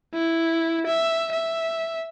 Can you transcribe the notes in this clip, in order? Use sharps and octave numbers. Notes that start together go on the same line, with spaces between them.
E4
E5
E5